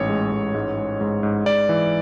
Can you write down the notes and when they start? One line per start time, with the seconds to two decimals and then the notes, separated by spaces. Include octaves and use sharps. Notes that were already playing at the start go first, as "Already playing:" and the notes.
Already playing: A1 G#2 C#5
0.09 G#3
0.31 A1
0.55 G#2
0.77 G#3
1.01 G#2
1.23 G#2
1.46 G#2 D5
1.69 E3